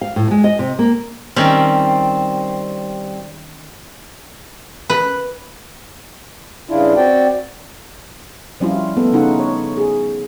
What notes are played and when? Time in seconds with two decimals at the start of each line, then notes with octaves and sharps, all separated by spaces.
0.01 F5
0.16 A2
0.31 G#3
0.44 D#5
0.59 C3
0.79 A#3
1.36 D#3 G3 C4 C#4
4.90 B4
6.69 G2 C#3 D4 E4 F4
6.96 C4 F#4 D5 G5
8.60 F3 G3 C#4 E4 F4
8.97 A3 B3 A4
9.13 C#3 C#4 D#4 F4 F#5
9.39 C#5
9.77 G#4